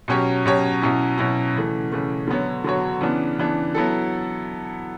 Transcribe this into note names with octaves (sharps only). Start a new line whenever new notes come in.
B2 F#3 C#4 G4 C#5
B2 F#3 C#4 G4 C#5
B2 F#3 C#4 E4
B2 F#3 C#4 E4
C#3 E3 A3
C#3 E3 A3
D3 F#3 B3 F#4 C#5
D3 F#3 B3 F#4 C#5
C#3 E3 B3 D4
C#3 E3 B3 D4
F#3 B3 E4 A4